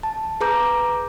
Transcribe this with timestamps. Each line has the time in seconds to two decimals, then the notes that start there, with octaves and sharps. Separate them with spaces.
0.03 A5
0.41 G#4 B4 A#5 D6 G6